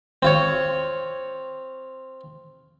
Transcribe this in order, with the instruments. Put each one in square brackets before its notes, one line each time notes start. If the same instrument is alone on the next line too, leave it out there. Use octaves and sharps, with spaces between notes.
[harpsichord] C4 F4 C#5